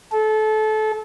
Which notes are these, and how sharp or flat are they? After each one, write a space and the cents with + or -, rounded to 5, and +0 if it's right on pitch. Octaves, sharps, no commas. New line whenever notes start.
A4 -25